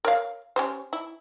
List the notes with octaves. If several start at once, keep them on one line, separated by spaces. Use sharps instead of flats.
A#4 C#5 F5
C#4 G4 C5
E4